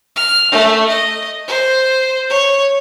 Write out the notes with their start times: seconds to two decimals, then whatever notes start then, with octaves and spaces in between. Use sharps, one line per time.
0.16 F6
0.51 A3
0.88 D#5
1.47 C5
2.30 C#5